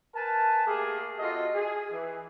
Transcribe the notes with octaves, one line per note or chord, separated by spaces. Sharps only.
A#4 B4 G#5 A5
A3 A#3 G4 G#4
C3 F4 F#4 A4 D#5
G#4
E3